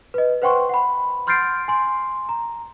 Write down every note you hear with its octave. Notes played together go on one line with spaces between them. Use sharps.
B4 D#5
B4 C5 F#5 G5 C6 C#6
F#5 B5
C6 F6 G6 A6 C7 D7
G#5 C6
A#5